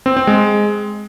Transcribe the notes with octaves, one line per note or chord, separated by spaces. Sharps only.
C4
C4
G#3